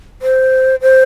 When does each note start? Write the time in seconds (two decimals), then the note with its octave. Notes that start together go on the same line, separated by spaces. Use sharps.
0.22 C5
0.81 C5